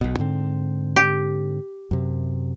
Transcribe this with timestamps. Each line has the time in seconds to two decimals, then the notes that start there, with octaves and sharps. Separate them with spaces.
0.01 B1 B2
0.19 G#2 D3 C4
0.96 G4
1.91 F#2 C3